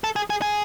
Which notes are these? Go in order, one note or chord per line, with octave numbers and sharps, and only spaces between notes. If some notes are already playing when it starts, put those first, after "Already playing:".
A4
G#4
G#4
G#4